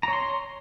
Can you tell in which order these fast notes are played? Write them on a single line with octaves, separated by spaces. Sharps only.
A#5 C#5 C6